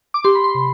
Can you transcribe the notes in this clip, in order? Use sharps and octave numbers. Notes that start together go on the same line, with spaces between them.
D6
G4 C6
B5
C6
C3